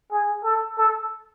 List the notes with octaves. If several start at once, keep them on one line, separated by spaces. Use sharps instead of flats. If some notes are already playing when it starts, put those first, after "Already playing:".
G#4
A4
A4